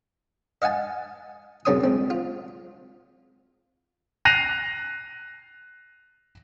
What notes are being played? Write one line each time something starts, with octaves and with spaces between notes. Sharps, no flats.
D#5 F5 F#5 G#5 A5
F#2 C#3 C4 C#5 C6 D#6
C#2 C4
F4
F#6 A#6 C7 D#7 F7